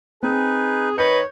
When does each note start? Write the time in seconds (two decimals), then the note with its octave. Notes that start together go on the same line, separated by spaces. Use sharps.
0.23 C4 D#4 G#4 B4
0.98 D#3 B4 C#5 D#5 G6